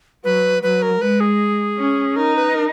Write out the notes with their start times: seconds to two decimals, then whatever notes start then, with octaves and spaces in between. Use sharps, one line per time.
0.24 F#3 B4
0.63 F#3 B4
0.82 A#4
1.01 G#3 B4
1.20 G#4
1.77 C#4
2.16 D#4 A#4
2.36 B4
2.55 A#4